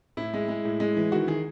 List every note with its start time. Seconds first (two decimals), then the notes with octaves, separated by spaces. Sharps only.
0.17 A2 E4
0.34 G#3
0.48 G#3
0.65 A2
0.80 G#3
0.97 E3
1.12 D#3 F#4
1.27 D#3 G#4